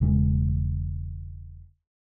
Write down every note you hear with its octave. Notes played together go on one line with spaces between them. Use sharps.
E1 C#3 G#3